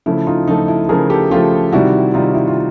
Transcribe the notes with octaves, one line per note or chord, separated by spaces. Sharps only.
C#3 F3 A3 E4
D#4 F4
C#3 F3 A3 D#4
E4
C#3 F3 A3 G#4 A#4
G4 A4
C#3 F3 A3 F4 G4
C3 D#3 G3 E4 F#4
C3 D#3 G3 D#4 F4
E4
F4